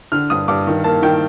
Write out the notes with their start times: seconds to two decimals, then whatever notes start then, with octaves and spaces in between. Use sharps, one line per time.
0.12 D3 F6
0.30 G2 D#6
0.48 G2 D6
0.67 D#3
0.84 A#3 A5
1.02 D#3 G5